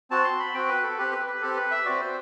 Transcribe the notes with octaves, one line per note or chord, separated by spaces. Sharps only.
C4 F#4 A5
C6
B5
C4 F#4 G5
B4
A4
C4 G4 B4
B4
B4
C4 G4 A4
B4
E5
C4 F#4 D5
C5